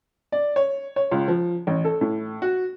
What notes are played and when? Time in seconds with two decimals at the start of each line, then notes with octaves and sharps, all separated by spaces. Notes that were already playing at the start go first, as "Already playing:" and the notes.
0.32 D5
0.56 C#5
0.96 C#5
1.11 C#2
1.28 F3
1.67 A1
1.85 A4
2.01 A2
2.42 F#4